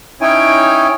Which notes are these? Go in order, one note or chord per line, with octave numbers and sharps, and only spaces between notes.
C#4 D#4 E4 C#5 G5 G#5